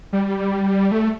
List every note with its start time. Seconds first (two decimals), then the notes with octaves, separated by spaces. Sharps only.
0.13 G3
0.92 A3